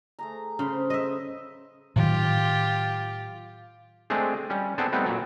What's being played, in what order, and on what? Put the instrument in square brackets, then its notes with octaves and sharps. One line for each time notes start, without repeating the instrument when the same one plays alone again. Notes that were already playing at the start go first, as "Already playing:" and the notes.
[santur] A3 G#4 A#5
[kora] C#3 [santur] B4 C5 C6
[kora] D#5 E5
[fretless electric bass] A2 D#3 F#3 [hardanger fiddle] F4 G4
[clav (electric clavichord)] G#3 A3 C4 D4 G#4
G3 C#4
B3 C4 D4 G#4 A4
G3 A3 B3 C4 D#4
A#2 F#3